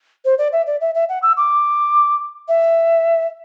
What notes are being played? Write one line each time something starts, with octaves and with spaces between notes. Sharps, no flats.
C5
D5
E5
D5
E5
E5
F#5
E6
D6
E5